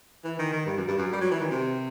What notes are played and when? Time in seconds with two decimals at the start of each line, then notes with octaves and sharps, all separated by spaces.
0.24 E3
0.39 D#3
0.53 D#3
0.66 G2
0.77 F#2
0.88 G2
0.98 F#2
1.13 G3
1.21 F#3
1.31 E3
1.41 D#3
1.51 C3